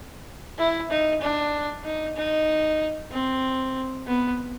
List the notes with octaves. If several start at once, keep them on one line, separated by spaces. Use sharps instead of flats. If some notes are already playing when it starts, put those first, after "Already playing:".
E4
D#4
D4
D#4
D#4
C4
B3